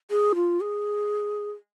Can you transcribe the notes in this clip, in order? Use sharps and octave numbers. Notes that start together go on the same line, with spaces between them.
G#4
F4
G#4